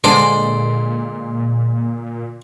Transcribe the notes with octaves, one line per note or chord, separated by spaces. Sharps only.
A#2 D3 G#3 C5 D5